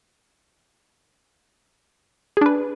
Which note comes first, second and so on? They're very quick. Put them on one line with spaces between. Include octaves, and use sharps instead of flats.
G#4 D4 B4